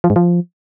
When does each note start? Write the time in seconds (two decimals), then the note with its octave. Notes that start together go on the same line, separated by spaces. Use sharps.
0.04 F3
0.10 G#2
0.16 F3